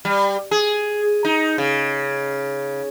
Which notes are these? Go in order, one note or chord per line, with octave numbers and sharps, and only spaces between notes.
G3
G#4
D#4
C#3